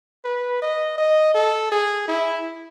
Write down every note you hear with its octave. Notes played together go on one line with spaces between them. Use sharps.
B4
D#5
D#5
A4
G#4
E4